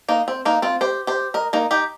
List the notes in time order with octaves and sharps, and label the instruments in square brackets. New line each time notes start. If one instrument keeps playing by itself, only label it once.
[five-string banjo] A#3 D#4
C4
A#3 D#4
C4 F4
G4 C5
G4 C5
A#4 D#5
A#3 D#4
D#4 G4